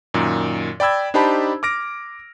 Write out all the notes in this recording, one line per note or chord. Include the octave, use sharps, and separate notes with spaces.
F#2 A#2 D#3
D5 G5 B5 E6 G#6
D4 D#4 G4 C5 A5 B5
D6 F6 A#6 D7